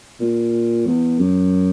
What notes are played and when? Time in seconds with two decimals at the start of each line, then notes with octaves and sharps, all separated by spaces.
0.20 A#2
0.86 E2
1.19 F#2